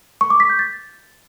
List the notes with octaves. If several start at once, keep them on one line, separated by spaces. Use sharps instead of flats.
C#6
D6
B6
G6
A6